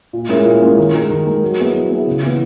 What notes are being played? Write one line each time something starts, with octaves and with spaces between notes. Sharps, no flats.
A#2
G#3 C#4 E4 A#4
A#2
G#3 C#4 E4 A#4
D#3
G#3 D#4 A#4
D#3
G#3 D#4 A#4
F#3
B3 E4 G#4
F#3
B3 E4 G#4
C#3
E3 B3